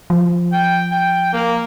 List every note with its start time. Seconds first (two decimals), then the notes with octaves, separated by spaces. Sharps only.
0.10 F3
0.53 G5
0.92 G5
1.33 A#3